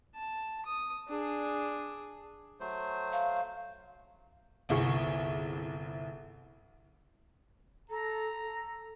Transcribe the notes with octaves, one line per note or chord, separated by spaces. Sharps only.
A5
D#6
D4 G#4
F#3 A3 C5
F5
G1 C2 E4 G#4 C#6
A4 A#5
A4